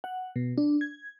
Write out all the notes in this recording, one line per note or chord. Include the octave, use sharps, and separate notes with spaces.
F#5
B2
D4
G#6